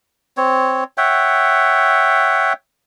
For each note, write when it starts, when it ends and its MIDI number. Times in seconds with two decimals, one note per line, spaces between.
0.37 0.84 60
0.37 0.84 73
0.98 2.53 73
0.98 2.53 76
0.98 2.53 78
0.98 2.53 79